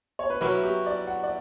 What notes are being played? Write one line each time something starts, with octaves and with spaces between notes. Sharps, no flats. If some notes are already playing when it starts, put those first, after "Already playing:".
C#5
B4
F#3 C#4 E4 A#4 B4
G4
D5
F#5
D5